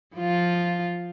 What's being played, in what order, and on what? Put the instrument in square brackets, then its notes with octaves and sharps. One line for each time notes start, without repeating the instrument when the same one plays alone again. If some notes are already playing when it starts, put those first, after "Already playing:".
[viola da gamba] F3 F4